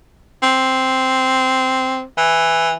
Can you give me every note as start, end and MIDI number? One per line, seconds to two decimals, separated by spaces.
0.43 2.03 60
2.17 2.74 52